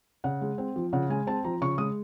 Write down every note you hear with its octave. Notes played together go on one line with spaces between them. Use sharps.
C#3 F#5
G#3
C4
F3
C#3 F#5
G#3 G#5
C4 A5
F3 A#5
C#3 C#6
G#3 D#6